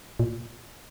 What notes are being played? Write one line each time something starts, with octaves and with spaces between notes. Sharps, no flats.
A#2